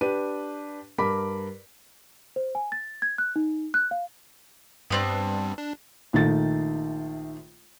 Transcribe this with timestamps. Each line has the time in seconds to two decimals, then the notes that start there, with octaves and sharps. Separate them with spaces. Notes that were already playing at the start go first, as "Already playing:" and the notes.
0.01 D4 G4 B4 D#7
0.98 G2 A#4 B5 D6 B6
2.36 C5
2.55 G#5
2.72 A6
3.02 G#6
3.18 F#6
3.36 D#4
3.74 F#6
3.91 F5
4.90 G2 G3 B3 C4 D4
5.58 D4
6.13 A#1 D#3 A3 A6